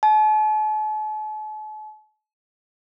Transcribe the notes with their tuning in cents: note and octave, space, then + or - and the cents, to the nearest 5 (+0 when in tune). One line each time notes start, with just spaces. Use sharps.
A5 -45